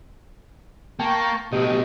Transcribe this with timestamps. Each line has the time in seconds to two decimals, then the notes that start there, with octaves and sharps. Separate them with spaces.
0.99 A#3 G5 A5 C#6
1.52 B1 A2 G4 D#5